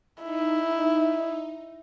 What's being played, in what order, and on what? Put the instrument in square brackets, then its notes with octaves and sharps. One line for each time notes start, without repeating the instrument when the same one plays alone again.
[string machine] D#4 [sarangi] E4